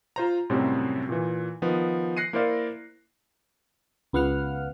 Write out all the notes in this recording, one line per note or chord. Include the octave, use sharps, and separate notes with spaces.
F4 C5 A#5
F#2 A2 C3 F#3 G3 C4
A#2 E3
D#3 F3 B3
F#6 A#6 C7 C#7 D#7
A#3 E4 A#4 C5 D5 F5
C#2 B3 F5 F#5 F6